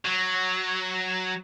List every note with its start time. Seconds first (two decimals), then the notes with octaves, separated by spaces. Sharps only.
0.05 F#3